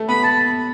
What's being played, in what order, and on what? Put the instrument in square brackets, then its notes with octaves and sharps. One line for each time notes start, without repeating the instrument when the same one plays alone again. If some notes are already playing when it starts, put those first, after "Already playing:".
Already playing: [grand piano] A3
[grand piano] B3 [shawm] B5
[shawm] A5